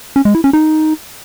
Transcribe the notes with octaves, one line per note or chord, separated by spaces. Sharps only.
C#4
G#3
E4
C#4
D#4